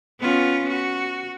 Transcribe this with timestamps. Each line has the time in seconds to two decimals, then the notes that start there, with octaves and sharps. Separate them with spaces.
0.20 B3 C#4 F4
0.69 F#4